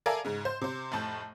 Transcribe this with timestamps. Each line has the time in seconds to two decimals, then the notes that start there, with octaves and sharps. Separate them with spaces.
0.06 A4 A#4 D5 E5 F5 G#5
0.25 G#2 C#3
0.45 C5
0.61 C3 C5
0.92 F1 A2 A5 G6